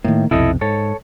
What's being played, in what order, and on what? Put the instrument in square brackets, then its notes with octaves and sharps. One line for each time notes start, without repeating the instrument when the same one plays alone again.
[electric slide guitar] A2 [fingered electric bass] D#3 A#3
[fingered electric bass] B1 F2 C3 [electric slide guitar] E4 A4 D#5
[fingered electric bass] G#2 [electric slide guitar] A4 C#5